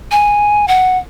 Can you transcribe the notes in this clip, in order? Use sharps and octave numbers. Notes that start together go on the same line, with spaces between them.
G#5
F#5